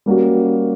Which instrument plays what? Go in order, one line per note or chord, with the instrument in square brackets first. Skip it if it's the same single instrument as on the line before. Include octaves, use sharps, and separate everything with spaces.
[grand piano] G3 A#3 C#4 F#4